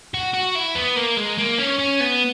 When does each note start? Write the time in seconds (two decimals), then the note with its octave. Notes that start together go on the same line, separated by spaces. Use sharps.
0.14 F#4
0.33 F#4
0.55 E4
0.75 B3
0.96 A#3
1.17 G#3
1.38 A#3
1.58 C#4
1.79 C#4
2.00 B3